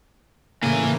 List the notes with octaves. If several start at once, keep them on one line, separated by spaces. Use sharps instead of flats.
A2 C#3 E3 A#3 G#5